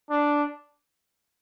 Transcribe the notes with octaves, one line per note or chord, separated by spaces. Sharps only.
D4